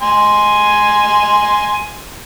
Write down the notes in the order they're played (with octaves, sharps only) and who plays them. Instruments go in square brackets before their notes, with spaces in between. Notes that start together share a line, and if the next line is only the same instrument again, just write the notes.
[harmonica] G#5 C6